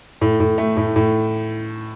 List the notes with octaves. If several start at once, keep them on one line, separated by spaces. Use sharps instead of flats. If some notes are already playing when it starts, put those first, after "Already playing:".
A2
A2
A3
A2
A2